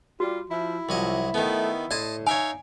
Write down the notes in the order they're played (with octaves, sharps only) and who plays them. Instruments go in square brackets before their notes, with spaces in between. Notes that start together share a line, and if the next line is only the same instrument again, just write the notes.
[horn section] G3 [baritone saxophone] F4 [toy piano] F#4
[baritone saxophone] F3 [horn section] E4
[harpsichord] C2 F#3 D#5 [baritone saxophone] F3
[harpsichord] D#3 B3 [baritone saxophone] A3
[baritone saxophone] A2 [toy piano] D5 [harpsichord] D#5 A5 C6
[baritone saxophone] D#4 [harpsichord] C#5 E5 F5 [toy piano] G#5